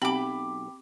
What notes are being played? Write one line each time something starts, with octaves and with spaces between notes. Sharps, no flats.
B1 C4 G4 G5 B5 D6